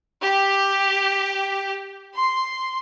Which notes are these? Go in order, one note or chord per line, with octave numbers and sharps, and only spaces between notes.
G4
C6